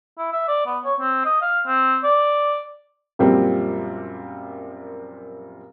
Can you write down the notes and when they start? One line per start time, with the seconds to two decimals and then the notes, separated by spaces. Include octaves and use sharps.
0.18 E4
0.33 E5
0.48 D5
0.66 B3
0.85 C#5
1.00 C4
1.25 D#5
1.42 F5
1.67 C4
2.04 D5
3.19 F#2 A#2 F3 G3 A#3 C4